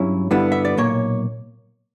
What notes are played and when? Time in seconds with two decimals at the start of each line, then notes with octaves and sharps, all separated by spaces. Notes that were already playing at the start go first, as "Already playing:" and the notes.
Already playing: G2 F#3 C#4 E4
0.31 G2 D3 G3 B3 E4
0.52 E5
0.65 D5
0.77 B1 A#2 A#3 C#5